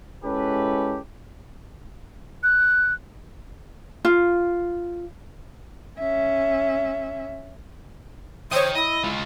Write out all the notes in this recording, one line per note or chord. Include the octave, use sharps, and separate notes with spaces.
G#3 C#4 E4 G4 A4 B4
F#6
F4
C#4 E5
C5 C#5 D#5 G5 D#6
E4 D#5
G#3 F4